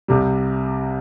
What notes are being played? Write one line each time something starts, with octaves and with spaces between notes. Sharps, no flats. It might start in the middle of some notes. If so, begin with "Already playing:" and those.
C2 C3 G3